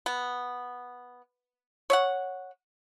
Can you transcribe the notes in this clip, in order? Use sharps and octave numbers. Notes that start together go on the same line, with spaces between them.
B3
C#5 E5 F#5